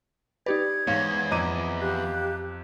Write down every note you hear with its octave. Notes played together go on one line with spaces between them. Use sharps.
D#4 G4 B4 D5 G#6
E2 G#2 C#5 F5
F2 D#5 A#5 D6 D#7
G4 F5 F#6